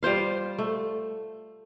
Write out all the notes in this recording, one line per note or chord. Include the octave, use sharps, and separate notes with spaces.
G3 F4 C5 F5
A3